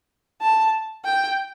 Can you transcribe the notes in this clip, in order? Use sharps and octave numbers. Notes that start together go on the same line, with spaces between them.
A5
G5